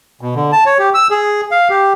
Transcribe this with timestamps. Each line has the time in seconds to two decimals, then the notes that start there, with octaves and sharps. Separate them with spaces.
0.21 B2
0.35 D3
0.52 A5
0.66 C#5
0.79 G4
0.94 E6
1.11 G#4
1.51 F5
1.70 G4